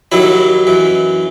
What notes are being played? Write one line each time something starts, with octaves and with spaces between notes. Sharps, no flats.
D#2 D#3 F#3 E4
F#2 E3